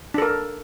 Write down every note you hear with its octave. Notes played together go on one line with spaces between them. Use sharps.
D4 A4 A#4